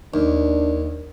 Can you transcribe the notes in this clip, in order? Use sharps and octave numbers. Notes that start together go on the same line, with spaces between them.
D#2 D4